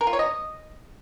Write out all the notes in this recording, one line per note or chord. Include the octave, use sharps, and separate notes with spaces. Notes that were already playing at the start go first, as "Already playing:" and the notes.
A#4
F4
C#5
D#5